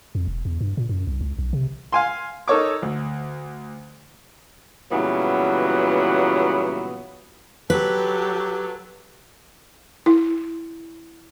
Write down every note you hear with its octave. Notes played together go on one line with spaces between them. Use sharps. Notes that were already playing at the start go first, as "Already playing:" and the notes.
F2
E1
E2
G2
A#2
F#2
C2
C#2
B1
C3
F5 G#5 C6
D#4 A4 A#4 C#5 C#6 D6
D2
A#2 C#3 E3 F#3 G3 B3
F#3 G4 A4 B4
E4